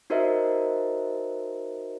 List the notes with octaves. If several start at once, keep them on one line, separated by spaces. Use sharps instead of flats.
D#4 F#4 A#4 C5 D#5 E5